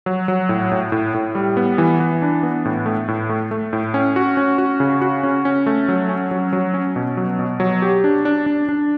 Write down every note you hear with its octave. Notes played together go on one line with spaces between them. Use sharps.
F#3
F#3
A2
A2
A2
A2
G3
B3
E3
E3
D4
B3
A2
A3
A2
A3
A3
A2
C#4
F#4
C#4
F#4
C#3
F#4
C#4
C#4
A3
F#3
C#4
F#3
F#3
C#4
B2
F#3
B2
F#3
G4
D4
D4
D4
D4